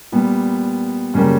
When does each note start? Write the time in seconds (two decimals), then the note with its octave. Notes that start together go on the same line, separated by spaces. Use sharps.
0.12 A#2 G3 B3
1.14 F#2 C#3 G3 A#3